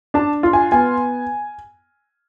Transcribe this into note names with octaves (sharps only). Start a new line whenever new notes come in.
D4 A5
F4
G#5
B3 G#5